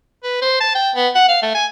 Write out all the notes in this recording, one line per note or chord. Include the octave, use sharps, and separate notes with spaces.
B4
C5
A5
G5
B3
F#5
F5
A3
G#5